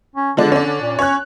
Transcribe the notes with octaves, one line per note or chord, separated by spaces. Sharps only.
C#4
D3 F3 G#3 D4
C#4 D4
D3
A#2
C#4 C#5 F#6